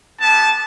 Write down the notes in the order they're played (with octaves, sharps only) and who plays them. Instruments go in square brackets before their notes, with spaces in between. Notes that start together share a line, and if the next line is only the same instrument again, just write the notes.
[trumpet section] B3 E4 G4 A5